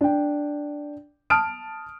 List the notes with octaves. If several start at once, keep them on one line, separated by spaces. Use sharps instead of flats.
D4 G5
A5 D#6 F6 D7